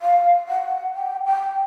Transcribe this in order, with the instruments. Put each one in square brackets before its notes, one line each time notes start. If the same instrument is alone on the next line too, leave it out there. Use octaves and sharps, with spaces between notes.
[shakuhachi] F5
F#5
G5
G5